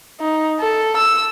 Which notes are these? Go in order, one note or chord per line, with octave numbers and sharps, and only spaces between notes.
D#4
A4
E6